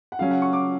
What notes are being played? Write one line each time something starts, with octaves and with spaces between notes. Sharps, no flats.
F#5
C#3 F#3 C#4 F5
F#5
C#6
D6